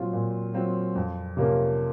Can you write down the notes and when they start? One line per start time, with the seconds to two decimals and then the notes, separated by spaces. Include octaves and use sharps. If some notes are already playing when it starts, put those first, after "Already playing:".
Already playing: A#2 F#3 C4 F4
0.13 A#2
0.54 F#3 C4 F4
0.95 F2
1.37 C3 F3 A#3 C#4